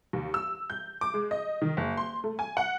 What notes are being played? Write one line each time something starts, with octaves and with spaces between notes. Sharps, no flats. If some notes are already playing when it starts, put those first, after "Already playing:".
D#2
E6
G6
D6
G#3
D#5
D#3
F#1
C6
A3
G#5
F#5